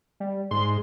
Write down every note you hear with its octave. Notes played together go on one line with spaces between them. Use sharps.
G3
G#2 C6